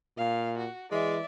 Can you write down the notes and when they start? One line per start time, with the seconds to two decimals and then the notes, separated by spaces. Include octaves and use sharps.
0.17 A#2 F5
0.58 F#4
0.92 E3 G#3 D5 E5